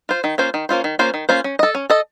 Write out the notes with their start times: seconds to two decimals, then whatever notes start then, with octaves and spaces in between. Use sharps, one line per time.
0.09 F4 C5
0.24 D#3
0.38 A#3 C#4 F4 C5
0.54 D#3
0.69 A#3 C#4 F4 C5
0.84 D#3
0.99 A#3 C#4 F4 C5
1.14 D#3
1.29 A#3 C#4 F4 C5
1.44 C#4
1.59 A4 D#5
1.75 C#4
1.90 A4 D#5